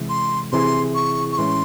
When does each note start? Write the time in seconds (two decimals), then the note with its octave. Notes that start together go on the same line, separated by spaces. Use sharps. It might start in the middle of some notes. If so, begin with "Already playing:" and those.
Already playing: C3 E3 G#3
0.09 C6
0.52 C3 E3 C4 E4 G#4 C6
0.95 C#6
1.32 C#6
1.38 A2 E3 G#3 C#4 C6